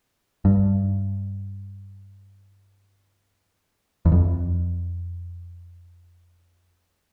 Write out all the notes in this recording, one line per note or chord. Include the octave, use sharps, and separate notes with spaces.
G2
E2
F2